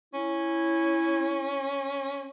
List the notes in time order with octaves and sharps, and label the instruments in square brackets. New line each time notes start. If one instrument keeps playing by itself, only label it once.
[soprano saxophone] C#4 [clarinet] E4